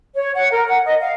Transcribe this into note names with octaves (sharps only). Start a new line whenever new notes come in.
C#5
F#5
A#4
F#5
D#5
F5